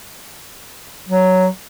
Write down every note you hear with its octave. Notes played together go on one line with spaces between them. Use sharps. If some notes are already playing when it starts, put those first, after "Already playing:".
F#3